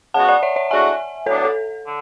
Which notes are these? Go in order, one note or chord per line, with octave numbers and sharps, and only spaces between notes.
C#3 G#3 B3 F#4 F#5 A5
D5 F#5
C#5 E5
C#5 E5
A2 G#3 D4 F#4 E5 G#5
A2 F#3 B3 D4 A4 C#5
A4
D3